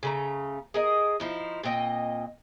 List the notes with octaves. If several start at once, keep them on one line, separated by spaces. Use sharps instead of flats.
C#3 A3 A#5
G#4 A#4 D#5
F3 D#4 E4
A#2 C4 D#5 G5